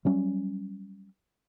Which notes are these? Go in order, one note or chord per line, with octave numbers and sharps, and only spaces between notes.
F#3 G3 C#4